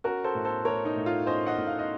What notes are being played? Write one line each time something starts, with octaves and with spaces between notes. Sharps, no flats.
C#4 F#4 A#4
A4 C5
A2
A4 C5
A3 A#4 C#5
D#4
A2
F4
C#4 C5 D#5
D#5 F#5
A2
F5
D#5